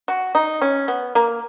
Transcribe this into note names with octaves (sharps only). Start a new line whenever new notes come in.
F#4
D#4
C#4
B3
A#3